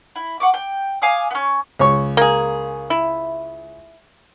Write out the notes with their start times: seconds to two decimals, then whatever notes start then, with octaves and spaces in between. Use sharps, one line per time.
0.16 E4
0.40 F#5 C#6 D6
0.54 G5
1.02 F5 G#5 D6 D#6
1.31 B3 C#4
1.79 C#2 C#5 C#6
2.17 A#3 G#4
2.90 E4